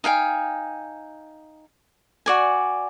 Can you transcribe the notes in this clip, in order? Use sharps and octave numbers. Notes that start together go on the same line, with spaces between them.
D#4 F5 G5 G#5
F#4 D5 G#5